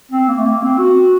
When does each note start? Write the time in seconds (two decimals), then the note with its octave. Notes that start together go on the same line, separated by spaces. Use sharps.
0.11 C4
0.28 A#3
0.37 A3
0.45 A#3
0.62 C4
0.79 F#4